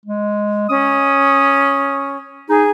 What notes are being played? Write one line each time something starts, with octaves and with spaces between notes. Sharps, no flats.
G#3
C#4 D#6
D#4 G#4